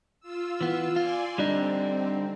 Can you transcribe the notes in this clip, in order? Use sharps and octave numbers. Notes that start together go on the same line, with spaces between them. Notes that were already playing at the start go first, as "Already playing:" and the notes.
F4 E6
E3 B3
F4 D5 G#5 C6
D3 G3 C4 D4 D#4